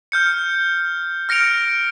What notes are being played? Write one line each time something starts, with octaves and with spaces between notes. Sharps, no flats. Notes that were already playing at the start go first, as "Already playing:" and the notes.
F6 G6 C#7
F6 A#6 C#7 D7 F7